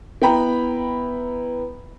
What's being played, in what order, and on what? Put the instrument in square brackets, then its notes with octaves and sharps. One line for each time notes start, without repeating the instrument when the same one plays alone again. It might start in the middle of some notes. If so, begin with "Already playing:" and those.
[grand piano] B3 E4 G5 A#5 B5